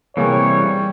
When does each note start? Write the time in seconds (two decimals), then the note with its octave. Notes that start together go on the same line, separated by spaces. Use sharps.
0.17 C3 E3 G3 A#3 G#4 C#5